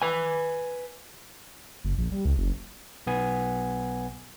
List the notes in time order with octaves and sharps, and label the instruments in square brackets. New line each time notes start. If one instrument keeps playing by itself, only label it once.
[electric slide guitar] B4 G#5
[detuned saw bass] F#1
A#1
G3
C#2
F#1
[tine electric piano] B1 B3 G#5